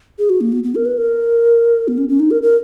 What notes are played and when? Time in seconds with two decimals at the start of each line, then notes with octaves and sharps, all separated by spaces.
0.19 G#4
0.30 F#4
0.41 A#3
0.52 B3
0.64 B3
0.75 A#4
0.85 B4
0.98 A#4
1.88 B3
1.98 C#4
2.09 C#4
2.20 D#4
2.31 A#4
2.42 A#4